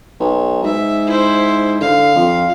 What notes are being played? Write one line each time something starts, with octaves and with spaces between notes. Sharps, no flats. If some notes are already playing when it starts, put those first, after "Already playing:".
B1
G#2 E5
E4 C5
D3 F5
F2